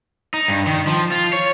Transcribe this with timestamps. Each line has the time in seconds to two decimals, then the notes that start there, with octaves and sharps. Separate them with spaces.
0.34 D#4
0.48 G2
0.67 D#3
0.87 F3
1.11 F4
1.33 C#5